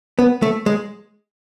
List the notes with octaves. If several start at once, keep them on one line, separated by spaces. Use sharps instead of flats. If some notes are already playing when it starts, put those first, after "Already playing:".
B3
A3
G#3